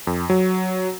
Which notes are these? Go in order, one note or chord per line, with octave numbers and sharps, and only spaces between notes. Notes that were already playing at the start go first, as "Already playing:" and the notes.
F2
F#3